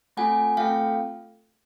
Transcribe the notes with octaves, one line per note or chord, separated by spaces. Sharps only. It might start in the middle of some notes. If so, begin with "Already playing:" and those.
A3 C4 F4 A4 F#5 G#5
A3 C4 F4 A4 F5 G5